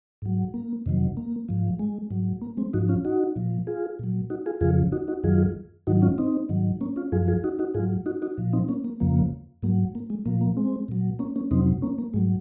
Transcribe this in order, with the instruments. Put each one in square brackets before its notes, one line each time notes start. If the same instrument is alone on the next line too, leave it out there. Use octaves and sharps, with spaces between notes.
[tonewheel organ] G#2 F#3
A#3
F2 C3 D#3 F#3
A#3
G#2 F3
G#3
G#2 F#3
A#3
G#3 C4
G#2 F3 D#4 F#4
C#4 F4
D#4 F#4
A#2 F3
F4 G#4
A#2 F#3
D#4 F#4
F4 G#4
F2 C#3 F3 F4 G#4
D#4 F#4
D#4 F#4
F#2 D#3 F#3 F4 G#4
G#2 D#3 F#3 D#4 F#4
C#4 F4
C4 D#4
G#2 D#3 F#3
A#3 C#4
C#4 F4
F#2 F3 F4 G#4
F4 G#4
D#4 F#4
D#4 F#4
G#2 F#3 F4 G#4
D#4 F#4
D#4 F#4
A#2 F3
C4 D#4
A#3 C#4
A#3
F2 C#3 F3 A#3
G#2 F#3 A#3
A#3
G#3
A#2 F3 A#3
A#3
G#3 C4
A#2 F#3
A#3 C#4
A#3 C#4
F2 C3 F#3 C4 D#4
A#3 C#4
A#3
G#2 F#3 G#3